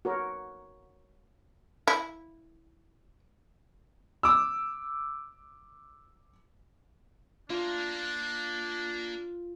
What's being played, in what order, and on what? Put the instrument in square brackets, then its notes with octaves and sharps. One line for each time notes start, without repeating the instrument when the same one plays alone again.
[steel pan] F#4 A#4 C#5
[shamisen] E4
[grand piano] D6 E6
[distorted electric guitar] A#3 A#4 [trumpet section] D4 [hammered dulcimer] F4